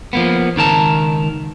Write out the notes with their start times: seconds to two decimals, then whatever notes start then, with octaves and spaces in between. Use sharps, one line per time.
0.13 F3 A#3 B3
0.56 C#2 D#3 A#4 A5